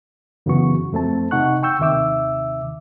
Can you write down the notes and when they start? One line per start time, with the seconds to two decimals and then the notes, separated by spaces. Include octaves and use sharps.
0.46 F#2 C#3 E3 B3 F#4 C#6
0.93 F2 A3 C4 A5
1.31 C3 D#4 F#5 C#6 F#6
1.63 G5 C#6 E6 G6
1.79 D#2 C3 D#3 E5 D6 E6